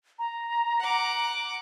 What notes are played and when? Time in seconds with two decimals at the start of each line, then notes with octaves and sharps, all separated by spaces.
0.19 A#5
0.80 F#5 D6